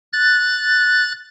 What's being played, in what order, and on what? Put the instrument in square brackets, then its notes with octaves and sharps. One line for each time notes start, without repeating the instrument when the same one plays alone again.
[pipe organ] F#6 A6